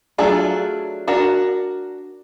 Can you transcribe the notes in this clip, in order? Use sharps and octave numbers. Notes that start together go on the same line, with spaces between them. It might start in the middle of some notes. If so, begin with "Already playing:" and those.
F#3 A3 D4 F4 G#4
D4 F#4 A#4